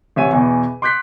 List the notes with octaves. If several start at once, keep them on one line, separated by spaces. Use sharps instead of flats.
A1 C3 C#5 E5 G#5 D#7
E2 B2 E3
C6 D6 F#6 G6 B6 C7